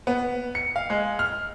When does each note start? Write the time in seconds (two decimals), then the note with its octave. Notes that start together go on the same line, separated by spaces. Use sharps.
0.07 B3
0.55 C#7
0.76 F5
0.90 G#3
1.19 F6